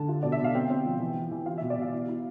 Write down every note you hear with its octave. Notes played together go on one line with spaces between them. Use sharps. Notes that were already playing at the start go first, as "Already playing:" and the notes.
Already playing: D3 A5
F4
B2 D5
E5
B2
F5
C4 G5
C4
F3
E3
E3
E3
F4 F5
E5
B2
D5
B2 F5
E4
E4